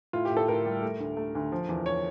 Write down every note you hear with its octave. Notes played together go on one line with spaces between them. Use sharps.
A2 F4
G4
A2
A4
A2 A#4
G3
A3
D2
A3
D2
F3
E2
C#5